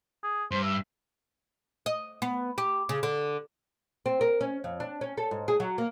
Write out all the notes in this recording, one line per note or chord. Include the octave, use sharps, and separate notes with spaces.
G#4
G2 C5
E5
D#5
B3
G4
C#3
D3
C4
A#4
C#4
F2
D4
C#4
A4
G#2
G#4
F#3
A#3